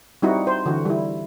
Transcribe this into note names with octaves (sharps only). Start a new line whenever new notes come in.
G3 C4 D#4 E4 F#4
C5
D3 E3 F#4
G3 E4